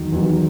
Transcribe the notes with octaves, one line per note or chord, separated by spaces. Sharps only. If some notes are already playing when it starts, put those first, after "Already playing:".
Already playing: E2 D#3 F#3
E2 D#3 F#3